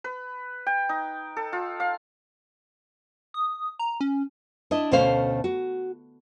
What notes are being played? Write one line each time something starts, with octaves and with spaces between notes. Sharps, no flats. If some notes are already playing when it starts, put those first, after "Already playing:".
B4
G5
D#4
A4
F4
F5
D#6
A#5
C#4
D4 E4 D#5
D2 B2 A3 C#4 C5 F5
F#4